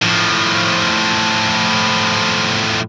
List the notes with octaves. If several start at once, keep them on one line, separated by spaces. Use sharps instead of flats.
A2 F3